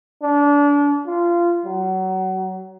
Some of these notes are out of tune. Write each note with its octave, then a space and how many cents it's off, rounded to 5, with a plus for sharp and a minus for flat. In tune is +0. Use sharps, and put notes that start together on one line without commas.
D4 -30
F4 -20
F#3 +25